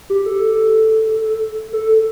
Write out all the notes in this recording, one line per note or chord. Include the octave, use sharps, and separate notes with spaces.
G4
A4
A4